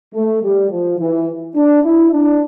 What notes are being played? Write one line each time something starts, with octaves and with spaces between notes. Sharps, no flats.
A3
G3
F3
E3
D4
E4
D4